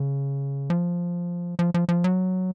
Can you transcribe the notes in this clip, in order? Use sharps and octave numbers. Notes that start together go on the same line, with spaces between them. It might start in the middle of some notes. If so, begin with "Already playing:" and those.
Already playing: C#3
F3
F3
F3
F3
F#3